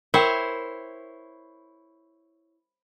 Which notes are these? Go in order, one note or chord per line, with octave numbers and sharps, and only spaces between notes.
E4 A#4 C5 C#5 G5